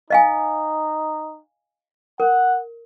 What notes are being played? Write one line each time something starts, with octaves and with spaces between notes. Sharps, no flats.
D#4 D#5 F5 G#5
A#4 F#5